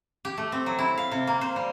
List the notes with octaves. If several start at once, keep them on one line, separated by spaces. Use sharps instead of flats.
G4
A3
C4
F#3
E4
F5
C3
A#3
C5
G3